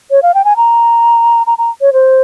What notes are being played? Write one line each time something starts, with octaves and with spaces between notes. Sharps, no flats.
C#5
F5
G5
G#5
A#5
A#5
A#5
C#5
C5